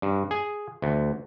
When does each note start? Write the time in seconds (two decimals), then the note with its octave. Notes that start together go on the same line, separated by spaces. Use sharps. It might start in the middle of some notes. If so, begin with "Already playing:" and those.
0.02 G2
0.31 G#4
0.82 D2